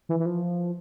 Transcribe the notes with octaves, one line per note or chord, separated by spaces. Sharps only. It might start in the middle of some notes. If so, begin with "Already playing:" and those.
E3
E3
F3